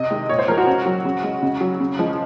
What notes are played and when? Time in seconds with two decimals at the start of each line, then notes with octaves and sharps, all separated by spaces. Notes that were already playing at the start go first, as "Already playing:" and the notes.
Already playing: C3 D#5
0.11 D#3 G#3
0.29 A#2 C#5
0.39 C5
0.48 F3 G#3 A#4
0.58 F#4
0.67 C#3
0.86 F#3
1.05 C#3
1.24 G#3
1.42 C#3
1.61 F#3
1.80 C#3
1.99 F3 G#3